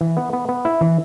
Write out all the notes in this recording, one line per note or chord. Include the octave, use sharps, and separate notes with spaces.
E3
B3
B3
B3
E4
E3